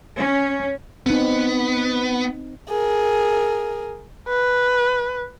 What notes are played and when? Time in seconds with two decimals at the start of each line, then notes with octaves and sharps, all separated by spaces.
0.16 C#4
1.06 B3 C4 D#4
2.69 G#4 A#4
4.29 B4